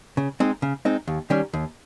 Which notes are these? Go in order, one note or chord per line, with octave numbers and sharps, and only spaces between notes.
C#3
G#3 C4 D#4
C#3
G#3 C4 D#4
D#2
D#3 G3 C#4
D#2